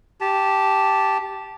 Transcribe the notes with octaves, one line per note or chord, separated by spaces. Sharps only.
G4 A5